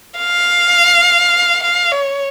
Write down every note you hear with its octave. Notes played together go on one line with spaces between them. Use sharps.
F5
F5
C#5